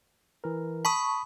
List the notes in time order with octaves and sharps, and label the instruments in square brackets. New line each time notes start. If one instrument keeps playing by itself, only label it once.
[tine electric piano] E3 A#4
[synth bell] A5 C#6 [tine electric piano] B5 D#6